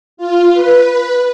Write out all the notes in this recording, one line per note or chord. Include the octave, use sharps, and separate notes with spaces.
F4
B4